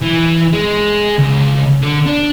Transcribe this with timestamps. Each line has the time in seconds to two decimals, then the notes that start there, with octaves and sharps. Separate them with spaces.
0.02 E3
0.53 G#3
1.19 C#2
1.82 D3
2.06 D4